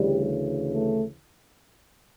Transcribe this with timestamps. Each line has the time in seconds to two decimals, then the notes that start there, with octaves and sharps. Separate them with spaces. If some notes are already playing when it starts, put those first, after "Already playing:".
Already playing: D2 C#3 E3 G3
0.73 A3